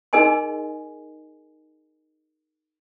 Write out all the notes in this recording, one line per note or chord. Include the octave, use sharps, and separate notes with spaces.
D#4 G#4 A#4 D#5 G#5 C6